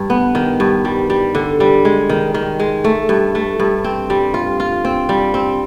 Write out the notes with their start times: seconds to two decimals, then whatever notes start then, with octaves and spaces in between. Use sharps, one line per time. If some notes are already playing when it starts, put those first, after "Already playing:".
Already playing: G2
0.10 B3
0.35 D#3
0.60 G2
0.85 G3
1.10 G3
1.35 D3
1.60 G3
1.85 G#3
2.09 D#3
2.34 D#3
2.60 G#3
2.84 A3
3.09 G2
3.35 A3
3.60 G2
3.84 C4
4.10 G3
4.34 F4
4.60 F4
4.85 C4
5.09 G3
5.34 C4